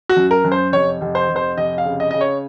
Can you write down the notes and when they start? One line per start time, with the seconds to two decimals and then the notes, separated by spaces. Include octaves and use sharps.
0.09 F#4
0.17 F#2
0.31 A#4
0.45 F#2
0.52 C5
0.72 F1 C#5
1.01 F1
1.15 C5
1.29 F1
1.36 C5
1.57 F1 D#5
1.78 F5
1.85 C#3
2.00 D#5
2.11 C#3 D#5
2.21 C#5